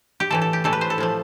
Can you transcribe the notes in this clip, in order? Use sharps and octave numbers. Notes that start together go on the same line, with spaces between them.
G4
A2 E3 A3 A4
A4
G4
A2 E3 A3 A4
B4
C5
A4
A2 F3 A3